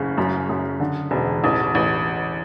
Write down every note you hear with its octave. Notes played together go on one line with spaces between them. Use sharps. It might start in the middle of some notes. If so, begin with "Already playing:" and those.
Already playing: F#1 C#3
F#2
F#2
D3
E1
A1
A1